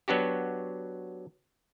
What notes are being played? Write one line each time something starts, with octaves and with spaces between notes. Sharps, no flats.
F#3 B3 D4 F#4 G4